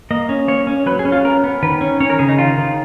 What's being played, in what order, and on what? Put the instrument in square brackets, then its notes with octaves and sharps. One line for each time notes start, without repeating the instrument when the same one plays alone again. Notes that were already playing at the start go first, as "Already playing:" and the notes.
[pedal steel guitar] A#3 D#5
C#4
A#3 C#5
C#4
F#3 B4
G#4
C#4
F4
B3 A#4
B3
D#3 B4
C#4
C#4 C#5
A#4
C#3 G#4
D#4
D#3 F4
D#3